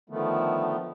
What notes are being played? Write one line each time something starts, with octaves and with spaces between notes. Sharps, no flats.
D3 D#3 F3 A3 B3